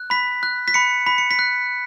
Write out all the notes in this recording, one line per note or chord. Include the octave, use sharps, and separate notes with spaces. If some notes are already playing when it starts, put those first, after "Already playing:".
Already playing: F#6
B5 B6
F#6
B6
B5 C#7
B5 B6
C#7
B6
F#6